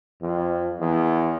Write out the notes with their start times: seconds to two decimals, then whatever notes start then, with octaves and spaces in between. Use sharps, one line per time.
0.22 F2
0.80 E2